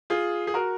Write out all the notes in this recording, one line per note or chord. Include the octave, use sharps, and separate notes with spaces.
F4 G#4
G#4
F#4 A#4